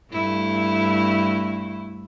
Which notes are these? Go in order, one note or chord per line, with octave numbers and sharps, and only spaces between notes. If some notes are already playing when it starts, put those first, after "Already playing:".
G2 A3 E4